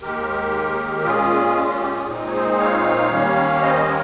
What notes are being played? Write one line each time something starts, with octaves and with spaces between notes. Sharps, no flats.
D#2 D#3 G#3 G4 A#4
A#2 G#3 C#4 F4 G#4
F4
G4
F4 G#4
A#2 G#3 C4 D#4
C#5
G#4 C5
C#5 F5
D#2 D#3 G3 A#3 C#4
C5 D#5
A#4 C#5